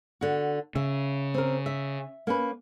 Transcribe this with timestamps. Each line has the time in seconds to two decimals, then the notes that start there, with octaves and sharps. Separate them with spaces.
0.21 D3 F#4
0.76 C#3 E5
1.34 C4 A#4
1.66 E5
2.27 A#3 C#4 B4